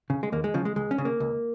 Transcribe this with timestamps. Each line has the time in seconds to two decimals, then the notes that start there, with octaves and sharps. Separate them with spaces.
0.10 C#3
0.23 G#3
0.32 D#2 A#3
0.44 G#3
0.54 C#3 F3
0.65 G#3
0.76 C#2 G#3
0.91 C#4
0.98 C#3
1.05 A#3
1.20 C#2